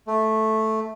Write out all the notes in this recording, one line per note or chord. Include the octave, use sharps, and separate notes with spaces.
A3